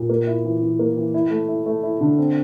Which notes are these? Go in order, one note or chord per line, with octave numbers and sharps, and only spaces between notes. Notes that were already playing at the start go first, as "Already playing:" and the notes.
Already playing: A#2
A#3
E4
E3
E3
A#3
E3
E4
A3
E4
A3
E4
D3
C4